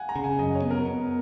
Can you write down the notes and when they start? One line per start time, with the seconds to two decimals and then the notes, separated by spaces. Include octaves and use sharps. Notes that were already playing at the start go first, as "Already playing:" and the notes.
Already playing: F5 F#5 G#5
0.09 A#5
0.16 C#3
0.24 G#5
0.39 F#2 D#5
0.55 C#5
0.62 B3
0.71 A#4
0.85 B3